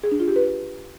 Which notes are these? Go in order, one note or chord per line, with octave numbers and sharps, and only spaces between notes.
G#4
D4
F4
G4
B4